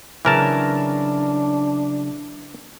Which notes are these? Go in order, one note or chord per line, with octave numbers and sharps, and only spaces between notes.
C#3 E3 F#3 D4 A#4 A5